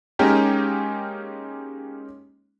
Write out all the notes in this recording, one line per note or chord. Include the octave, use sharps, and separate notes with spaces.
G#3 A#3 C#4 D#4 G4 A#4